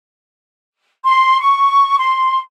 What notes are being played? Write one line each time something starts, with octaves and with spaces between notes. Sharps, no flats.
C6
C#6
C6